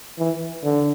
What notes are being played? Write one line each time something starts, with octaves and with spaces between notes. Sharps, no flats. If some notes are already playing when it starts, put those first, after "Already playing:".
E3
D3